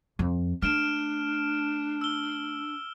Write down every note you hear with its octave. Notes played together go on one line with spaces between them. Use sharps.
F2
A3 D4 F6 D7 E7
E6 G7